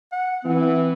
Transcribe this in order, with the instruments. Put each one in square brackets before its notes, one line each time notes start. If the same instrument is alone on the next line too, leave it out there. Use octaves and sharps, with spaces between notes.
[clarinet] F#5
[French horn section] E3 [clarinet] C4